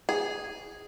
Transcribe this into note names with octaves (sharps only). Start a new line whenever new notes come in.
G#4